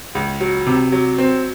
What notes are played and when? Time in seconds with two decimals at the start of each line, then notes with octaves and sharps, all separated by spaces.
0.15 C#2
0.40 F#3
0.66 C3
0.92 F#3
1.18 C4